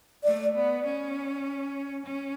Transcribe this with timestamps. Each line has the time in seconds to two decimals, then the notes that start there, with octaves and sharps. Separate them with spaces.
0.24 A3 D5
0.54 B3
0.85 C#4
2.04 C#4